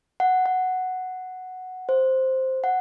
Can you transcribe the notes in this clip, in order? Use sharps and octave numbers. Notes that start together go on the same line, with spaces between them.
F#5
F#5
C5
F#5